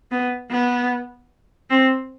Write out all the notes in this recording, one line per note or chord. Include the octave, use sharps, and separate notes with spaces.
B3
B3
C4